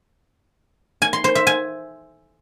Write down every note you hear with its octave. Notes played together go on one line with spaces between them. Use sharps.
G#5
C6
C5
E5
G#5